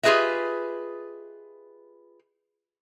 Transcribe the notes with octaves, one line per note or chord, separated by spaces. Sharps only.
F4 G4 G#4 B4 D#5 E5